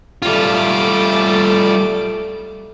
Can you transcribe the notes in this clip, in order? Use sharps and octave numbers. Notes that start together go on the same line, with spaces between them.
G3 A3 F4 D6